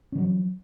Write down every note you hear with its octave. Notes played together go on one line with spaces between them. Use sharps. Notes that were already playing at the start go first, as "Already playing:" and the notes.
D#3 E3 F#3 C#4